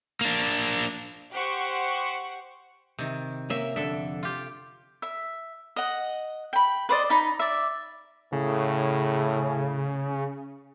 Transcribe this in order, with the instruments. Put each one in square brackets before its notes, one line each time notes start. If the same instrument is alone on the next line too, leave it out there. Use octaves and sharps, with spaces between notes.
[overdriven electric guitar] A#3 D4
[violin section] G4 C5 F#5 C#6
[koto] C3 D#3
[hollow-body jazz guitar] A#3 C#4 [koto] E5
[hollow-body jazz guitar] F2 D3 D4 [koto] A4 E5
[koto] F4 G4
[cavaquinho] E5
D#5 F#5
G5 B5
B4 C5 D5 D#5
D#4 B5
D5 E5
[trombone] A2 [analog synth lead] C#3